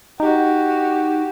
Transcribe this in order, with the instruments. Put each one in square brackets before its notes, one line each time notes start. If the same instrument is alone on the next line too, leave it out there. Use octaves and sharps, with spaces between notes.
[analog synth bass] D#4 [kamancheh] F#4 G4